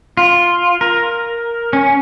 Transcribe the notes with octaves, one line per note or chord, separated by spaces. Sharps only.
F4
A#4
C#4